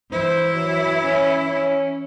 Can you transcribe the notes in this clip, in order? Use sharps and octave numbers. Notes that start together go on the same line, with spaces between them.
E3 E4 C5
F#3
C#4
C#4